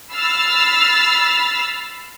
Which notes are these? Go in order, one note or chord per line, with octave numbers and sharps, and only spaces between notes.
B5 E6 F6 A6 C7